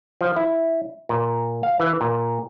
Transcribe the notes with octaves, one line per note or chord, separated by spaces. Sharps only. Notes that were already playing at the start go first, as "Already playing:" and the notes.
F3
E4
A#2
F5
E3
A#2